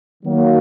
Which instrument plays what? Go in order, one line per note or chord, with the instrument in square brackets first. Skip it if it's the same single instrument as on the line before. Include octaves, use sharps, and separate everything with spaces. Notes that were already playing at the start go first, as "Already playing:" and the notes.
[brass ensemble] D#3 F#3 A#3